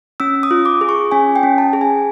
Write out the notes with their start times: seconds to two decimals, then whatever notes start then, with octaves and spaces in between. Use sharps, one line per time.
0.20 C#4 E6
0.43 D#6
0.51 F4
0.65 D6
0.81 G#4
0.89 C#6
1.11 C#4 G#5
1.36 G5
1.43 C#4
1.58 A5
1.73 G#4
1.81 G#5